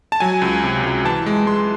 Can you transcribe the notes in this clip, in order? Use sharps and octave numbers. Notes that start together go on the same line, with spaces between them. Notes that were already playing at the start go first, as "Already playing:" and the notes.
A5
F#3 G#5
C#2
C3
C#2
E3 A5
G#3
G#3 C6